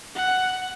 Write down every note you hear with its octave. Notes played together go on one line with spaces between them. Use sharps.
F#5